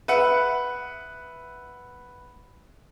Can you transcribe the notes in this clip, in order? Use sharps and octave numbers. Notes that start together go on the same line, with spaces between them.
B4 E5 F#5 F#6